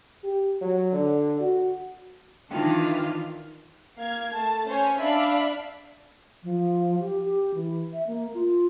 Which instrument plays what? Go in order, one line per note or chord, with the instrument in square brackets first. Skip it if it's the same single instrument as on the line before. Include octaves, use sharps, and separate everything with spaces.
[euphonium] G4
F#3
D3
F#4
[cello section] D#3 E3 [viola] D4 F4 [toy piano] D#4 G5
[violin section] A#3 F5 G#6
A3 A5
C#4 C5 C#5 G#5
D4 E5 F5 B5
[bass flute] F3
G4
G4
E3
E5
A#3
F4